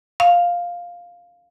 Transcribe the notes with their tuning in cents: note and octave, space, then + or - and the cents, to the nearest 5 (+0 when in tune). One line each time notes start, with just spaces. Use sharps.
F5 +5